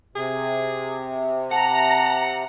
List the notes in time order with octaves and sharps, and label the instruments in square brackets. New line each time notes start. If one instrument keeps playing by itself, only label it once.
[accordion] C3 [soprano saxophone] G#4
[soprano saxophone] F#5 [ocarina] A5 [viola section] A#5